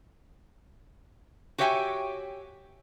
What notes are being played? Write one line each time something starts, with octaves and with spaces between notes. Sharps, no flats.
F#4 G4 C#5 E5 G5 G#5